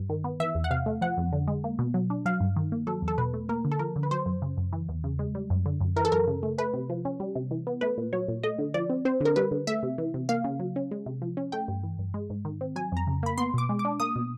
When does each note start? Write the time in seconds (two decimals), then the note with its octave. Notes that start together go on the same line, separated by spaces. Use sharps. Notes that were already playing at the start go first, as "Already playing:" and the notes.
Already playing: G2
0.09 D#3
0.24 B3
0.40 E3 E5
0.55 E2
0.64 F#5
0.71 C3 F5
0.86 A3
1.01 F3 F#5
1.17 F2
1.32 D3
1.48 G#3
1.64 A#3
1.79 B2
1.94 F#3
2.10 D4
2.25 F#3 F5
2.40 G2
2.56 D#3
2.72 A#3
2.87 F#3 A4
3.02 E2
3.08 A4
3.18 B2 B4
3.34 A3
3.49 A#3 A#4
3.65 D3
3.72 A4
3.79 F3 A#4
3.96 D3
4.03 B4
4.11 F#3 C5
4.26 F#2
4.42 C#3
4.57 F#2
4.73 E3
4.89 E2
5.04 C#3
5.19 G#3
5.35 G3
5.50 F#2
5.66 D3
5.80 F#2
5.96 E3 A#4
6.05 A4
6.12 F#2 A#4
6.27 C#3
6.43 A3
6.58 A3 B4
6.73 C3
6.90 F3
7.05 C#4
7.20 G3
7.35 C3
7.51 E3
7.67 B3
7.81 A3 B4
7.98 A#2
8.13 F#3 C#5
8.28 A#2
8.43 A3 D#5
8.58 D3
8.74 F3 D5
8.90 C4
9.05 C4 C5
9.20 D3 A#4
9.36 G3 B4
9.51 D3
9.67 A3 E5
9.83 C3
9.98 E3
10.14 C3
10.29 A#3 F5
10.44 C#3
10.60 F#3
10.76 C#4
10.91 G#3
11.06 C3
11.22 F3
11.37 C#4
11.52 A3 G5
11.68 G2
11.83 E3
11.99 G2
12.14 G#3
12.30 G#2
12.45 D#3
12.61 C4
12.76 F#3 G#5
12.92 F2 A#5
13.07 C#3
13.23 A#3 B5
13.38 B3 C6
13.54 B2 D6
13.69 G#3
13.79 D6
13.85 D4
14.00 A#3 D#6
14.16 B2